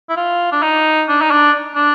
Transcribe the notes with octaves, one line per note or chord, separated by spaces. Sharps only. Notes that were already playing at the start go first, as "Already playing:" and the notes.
E4
F4
D4
D#4
D4
D#4
D4
D4